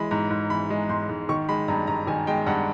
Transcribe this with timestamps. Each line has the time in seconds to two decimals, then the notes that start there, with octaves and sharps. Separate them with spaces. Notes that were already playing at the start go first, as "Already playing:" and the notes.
Already playing: E3 G#3 B5
0.11 G#2 A#5
0.30 G#2
0.50 E3 B5
0.70 G#3
0.89 G#2 C6
1.09 G#2
1.29 D#3 C#6
1.49 G#3 B5
1.68 G2 A#5
1.87 G2 A#5
2.07 D#3 G#5
2.27 G#3 G5
2.46 G2 F#5